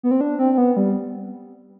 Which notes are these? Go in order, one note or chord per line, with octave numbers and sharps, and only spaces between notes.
B3
C4
D4
C4
C4
B3
G3